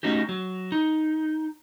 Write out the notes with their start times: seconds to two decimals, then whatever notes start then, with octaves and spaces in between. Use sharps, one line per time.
0.03 A3 C#4 D#4 F#4 G4
0.29 F#3
0.72 D#4